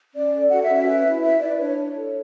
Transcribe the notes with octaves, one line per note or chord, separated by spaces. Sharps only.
C#4 D5
A4
F#4 F#5
E5
C#4
E5
B4
E4
B4 E5
E4 D5
D4 C#5
C#5
A4